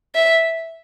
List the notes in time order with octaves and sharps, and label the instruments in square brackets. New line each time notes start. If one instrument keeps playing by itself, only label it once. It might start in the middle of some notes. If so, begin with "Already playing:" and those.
[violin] E5